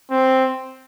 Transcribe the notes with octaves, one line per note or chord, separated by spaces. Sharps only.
C4